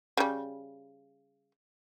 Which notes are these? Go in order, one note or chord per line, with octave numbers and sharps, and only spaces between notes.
C#3 G3